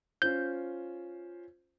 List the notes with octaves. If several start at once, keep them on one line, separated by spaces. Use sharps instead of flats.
C#4 F4 C5 G6